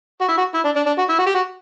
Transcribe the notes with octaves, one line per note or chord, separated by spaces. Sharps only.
F#4
E4
F#4
E4
D4
D4
D4
F#4
E4
F#4
G4
F#4